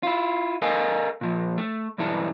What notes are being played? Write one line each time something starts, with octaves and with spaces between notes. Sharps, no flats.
E4 F4
A4 A#4 D#5 F5 G#5
A#2 F3
A3
B1 G2 E3 E4 A4